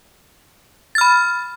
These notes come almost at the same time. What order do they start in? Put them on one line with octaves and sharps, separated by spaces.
A6 F6 B5